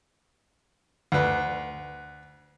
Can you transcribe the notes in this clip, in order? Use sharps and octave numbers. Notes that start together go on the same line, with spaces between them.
D2 B4